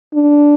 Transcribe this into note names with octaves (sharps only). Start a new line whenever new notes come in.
D4